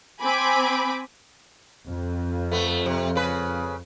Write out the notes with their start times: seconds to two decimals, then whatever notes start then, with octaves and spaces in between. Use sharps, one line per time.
0.22 C4 G#5 B5 D6
1.85 F2
2.52 A3 B3
2.86 C3
3.15 C#3 B4